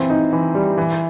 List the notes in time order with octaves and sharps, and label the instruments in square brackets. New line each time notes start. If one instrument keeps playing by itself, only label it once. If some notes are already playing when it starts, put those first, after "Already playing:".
Already playing: [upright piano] E3 C4
D#4
E3
G3
E3